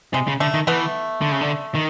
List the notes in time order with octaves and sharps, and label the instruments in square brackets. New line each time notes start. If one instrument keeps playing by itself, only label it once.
[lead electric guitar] C3 [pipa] G#3
[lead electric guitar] C#3
[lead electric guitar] D3 [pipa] A3
[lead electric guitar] D#3
[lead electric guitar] E3 [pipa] A3 B3
[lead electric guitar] D3
C#3
D3
D#3